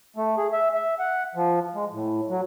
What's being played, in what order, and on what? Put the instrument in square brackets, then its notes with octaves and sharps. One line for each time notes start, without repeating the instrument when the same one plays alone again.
[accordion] A3
G#4
E5
E5
F#5
F3
G#3
A2
F#3